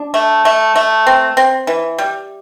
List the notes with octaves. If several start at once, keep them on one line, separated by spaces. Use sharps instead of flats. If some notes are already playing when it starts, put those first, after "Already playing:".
Already playing: D4
A3
A3
A3
C4
C4
E3
G3